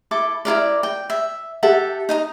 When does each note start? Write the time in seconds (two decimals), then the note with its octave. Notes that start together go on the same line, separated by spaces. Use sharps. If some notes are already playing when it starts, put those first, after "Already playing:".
0.11 E4 A4 D6
0.45 E4 F4 A#4 D5
0.83 G5
1.10 E5
1.63 G4 A4 E5 F#5
2.09 D#4 D#5 A#5